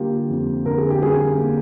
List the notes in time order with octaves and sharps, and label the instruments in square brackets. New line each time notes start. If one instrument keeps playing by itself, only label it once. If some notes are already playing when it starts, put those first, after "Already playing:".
Already playing: [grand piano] D3 G3 A#3 F4 G4
F2
D3 A#4
G#4
G4
G3 G#4
A#3